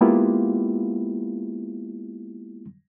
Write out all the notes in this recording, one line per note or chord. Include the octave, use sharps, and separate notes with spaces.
G#3 A#3 B3 E4 F4 G4